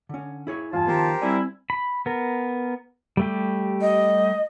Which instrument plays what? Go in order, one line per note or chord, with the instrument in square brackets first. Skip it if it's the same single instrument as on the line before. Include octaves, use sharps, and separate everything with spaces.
[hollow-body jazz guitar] D3 C#4
E4 G#4 C#5
[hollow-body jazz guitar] E2 G2 [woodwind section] F4 G#5 A5
[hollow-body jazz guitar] D#3 F3 B3 [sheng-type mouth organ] G4 A#4 C5
[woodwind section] G3 E4 [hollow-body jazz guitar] C4 G#5
[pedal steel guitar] B5
B3 A#4
G3 A3 G4
[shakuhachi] D#5